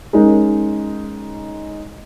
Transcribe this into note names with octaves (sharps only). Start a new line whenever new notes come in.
G#3 C#4 D#4 A#4